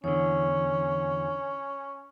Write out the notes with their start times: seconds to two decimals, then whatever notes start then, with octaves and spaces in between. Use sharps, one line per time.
0.04 E2 D3 C#4 C#5